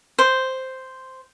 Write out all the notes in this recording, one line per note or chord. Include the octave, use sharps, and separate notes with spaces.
C5